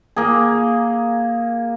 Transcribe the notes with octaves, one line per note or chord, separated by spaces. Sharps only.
A#3 G#4